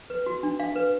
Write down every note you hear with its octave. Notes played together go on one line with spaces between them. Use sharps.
B4
F#4
D4
D4 F5
B4